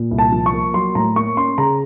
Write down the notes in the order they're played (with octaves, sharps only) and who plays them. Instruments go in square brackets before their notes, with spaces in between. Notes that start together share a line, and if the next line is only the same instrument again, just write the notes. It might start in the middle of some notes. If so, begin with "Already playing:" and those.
Already playing: [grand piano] A#2
C2
A5
F3
C#6
A#3
F#3 C6
A2 A#5
A#3 C#6
C#4 C6
C#3 A#5